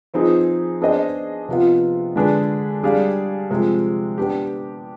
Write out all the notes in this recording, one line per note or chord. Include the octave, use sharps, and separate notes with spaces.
F3 C4 D#4 G#4 B4
B3 D4 G#4 C5 D#5
C3 F3 B3 F4
D3 G#3 D4 G#4 B4
G3 D4 G#4 D5 F5
C3 F3 G#3
B3 D4 G4